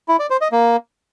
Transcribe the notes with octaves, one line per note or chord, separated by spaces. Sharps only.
E4
D5
C5
D#5
A#3